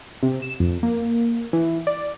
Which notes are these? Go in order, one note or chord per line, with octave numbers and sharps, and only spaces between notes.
C3
E7
F2
A#3
E3
D5